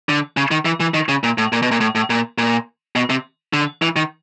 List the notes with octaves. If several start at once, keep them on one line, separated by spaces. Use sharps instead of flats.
D3
C#3
D#3
E3
E3
D#3
C#3
A#2
A2
A#2
B2
A#2
A2
A2
A#2
A#2
B2
C3
D3
E3
D#3